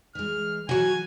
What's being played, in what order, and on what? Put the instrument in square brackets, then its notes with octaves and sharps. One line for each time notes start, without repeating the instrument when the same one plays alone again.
[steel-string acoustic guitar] E3 G#3 [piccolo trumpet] F6
[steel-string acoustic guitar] E3 [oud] F#3 F#4 [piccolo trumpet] G#5